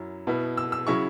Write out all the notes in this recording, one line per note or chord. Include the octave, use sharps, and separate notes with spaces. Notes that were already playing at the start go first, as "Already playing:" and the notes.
Already playing: F#2 F#3 C#4 E4
B2 B3 E4
E6
E6
C#3 F#3 C#4 E4 C#6